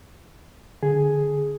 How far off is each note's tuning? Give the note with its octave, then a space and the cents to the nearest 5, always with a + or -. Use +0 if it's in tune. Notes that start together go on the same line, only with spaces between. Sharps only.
D3 +0 G#4 +0